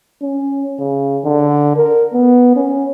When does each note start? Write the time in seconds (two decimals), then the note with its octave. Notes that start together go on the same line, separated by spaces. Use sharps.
0.22 C#4
0.79 C#3
1.24 D3
1.76 A#4
2.13 B3
2.56 C#4